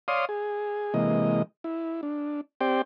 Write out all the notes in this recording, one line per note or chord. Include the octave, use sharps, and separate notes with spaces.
C#5 D5 F5 C6 D#6
G#4
C3 E3 G#3 A#3 D#5
E4
D4
C4 G4 C5 D5 G5